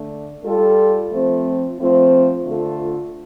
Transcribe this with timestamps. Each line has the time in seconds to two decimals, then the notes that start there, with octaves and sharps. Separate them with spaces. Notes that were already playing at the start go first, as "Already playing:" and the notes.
Already playing: D3 A3 D4
0.44 G3 F4 A4
1.12 F3 A3 C4
1.79 F3 A3 C4 F4
2.46 D3 A3 F4 A4